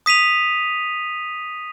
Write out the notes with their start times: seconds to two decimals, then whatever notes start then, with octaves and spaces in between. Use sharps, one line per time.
0.06 D#6 B6 D#7 F7